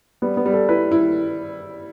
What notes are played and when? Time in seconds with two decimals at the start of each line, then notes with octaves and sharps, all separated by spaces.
0.22 G3 B3
0.37 B3
0.46 G3
0.54 A4
0.69 E4 B4
0.91 E4